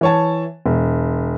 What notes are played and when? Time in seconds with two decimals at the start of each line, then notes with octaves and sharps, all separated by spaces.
0.01 E3 C#5 A5
0.66 E1